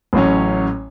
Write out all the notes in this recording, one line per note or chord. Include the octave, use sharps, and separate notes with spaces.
A1 A2 F#3 C#4